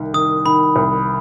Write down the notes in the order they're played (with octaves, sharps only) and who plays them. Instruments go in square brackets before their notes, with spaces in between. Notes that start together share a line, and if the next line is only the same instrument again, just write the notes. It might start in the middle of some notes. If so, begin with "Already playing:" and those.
Already playing: [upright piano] C2 D#3
[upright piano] D#3 [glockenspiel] D#6
[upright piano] D#3 [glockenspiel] B5
[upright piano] C2